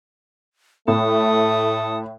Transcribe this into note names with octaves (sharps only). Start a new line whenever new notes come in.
A2 A3 A4 D#6